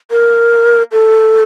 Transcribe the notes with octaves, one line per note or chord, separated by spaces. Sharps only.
A#4
A4